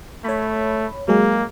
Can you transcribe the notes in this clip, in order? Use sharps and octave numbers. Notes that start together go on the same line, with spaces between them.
A3 C#5 B5
F#3 G#3 A#3 G#4